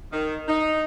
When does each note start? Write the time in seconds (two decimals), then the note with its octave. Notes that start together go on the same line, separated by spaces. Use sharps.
0.13 D#3
0.48 D#4